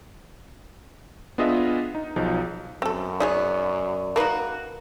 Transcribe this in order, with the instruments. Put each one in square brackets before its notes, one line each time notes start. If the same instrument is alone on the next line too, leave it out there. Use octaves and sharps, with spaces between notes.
[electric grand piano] B3 D4 F4 G#4 D#5 E5
D#4
B1 F3 D#4 G#4
[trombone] F#2 [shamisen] C4 A4
[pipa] B3 [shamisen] D#4 G#4 C#5 [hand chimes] D5
[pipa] A#3 D#4 F#4 [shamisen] A#4 B4